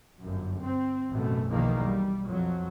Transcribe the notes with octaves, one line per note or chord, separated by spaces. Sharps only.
G1 F#2
C4
A1 F#2 B2 A3
B1 E2 B2 D#3 F3 A#3
G3
F2 F3 F#3